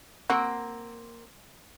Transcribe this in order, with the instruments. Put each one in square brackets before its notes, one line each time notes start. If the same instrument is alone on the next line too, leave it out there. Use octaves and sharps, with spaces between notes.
[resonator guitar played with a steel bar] A#3 C4 [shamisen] F#4